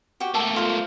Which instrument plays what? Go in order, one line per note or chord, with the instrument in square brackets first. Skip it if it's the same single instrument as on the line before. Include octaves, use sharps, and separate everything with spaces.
[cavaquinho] F#4 G4
[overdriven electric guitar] A3 A#3 [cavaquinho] A4
[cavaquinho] F4 C5